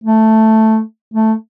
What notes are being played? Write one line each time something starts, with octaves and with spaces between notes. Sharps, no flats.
A3
A3